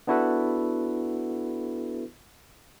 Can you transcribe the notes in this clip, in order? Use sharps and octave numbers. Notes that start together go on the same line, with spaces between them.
B3 D4 E4 F#4 A4 B4